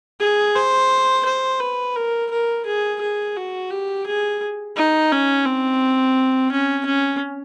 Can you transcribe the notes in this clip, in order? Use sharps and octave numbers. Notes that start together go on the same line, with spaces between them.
G#4
C5
C5
B4
A#4
A#4
G#4
G#4
F#4
G4
G#4
D#4
C#4
C4
C#4
C#4